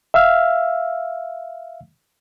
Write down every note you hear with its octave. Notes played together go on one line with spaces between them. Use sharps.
E5 F5 E6 F6